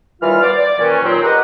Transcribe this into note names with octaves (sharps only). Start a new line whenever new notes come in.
D#2 E3 G3 F4 F5 F6
B3 C5 D5
D5
A#2 D#3 E3 C#4
D#2 A#2 F#3 C4
G4 A#4 B4 D#5 F#5